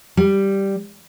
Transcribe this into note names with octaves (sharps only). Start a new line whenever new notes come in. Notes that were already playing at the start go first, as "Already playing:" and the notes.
G3